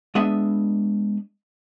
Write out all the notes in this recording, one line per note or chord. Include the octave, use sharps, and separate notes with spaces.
G#3 B3 D4 D#5 E5